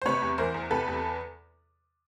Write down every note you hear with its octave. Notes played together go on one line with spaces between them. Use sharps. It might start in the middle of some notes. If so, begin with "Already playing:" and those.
C5
C3 B4 C#5
E2
E3 A#4 C5
E2
C3 A4 B4
E2